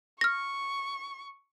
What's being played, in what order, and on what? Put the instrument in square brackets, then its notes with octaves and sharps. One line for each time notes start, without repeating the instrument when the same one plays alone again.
[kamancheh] C#6 [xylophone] F6 A#6